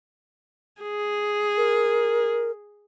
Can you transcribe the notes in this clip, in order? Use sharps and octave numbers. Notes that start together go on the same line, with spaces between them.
G#4
A#4